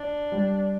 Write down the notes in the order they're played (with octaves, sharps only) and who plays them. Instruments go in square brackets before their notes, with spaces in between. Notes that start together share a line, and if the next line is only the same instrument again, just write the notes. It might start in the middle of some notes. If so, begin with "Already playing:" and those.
Already playing: [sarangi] D4
[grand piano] G3